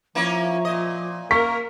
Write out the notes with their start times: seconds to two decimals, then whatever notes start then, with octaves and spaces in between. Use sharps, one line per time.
0.15 F3 A#3 C#4 E4
0.65 A#2 D#5
1.31 A#3 A#4 C#6 B6